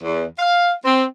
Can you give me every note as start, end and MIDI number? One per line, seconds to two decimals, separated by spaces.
0.02 0.24 40
0.38 0.72 77
0.84 1.02 60